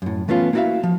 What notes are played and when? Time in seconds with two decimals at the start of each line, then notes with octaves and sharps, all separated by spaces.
0.02 F#2 A2
0.28 E3 A3 B3 C#4 F4
0.53 A#3 B3 E4 F#4 E5 F5
0.83 F3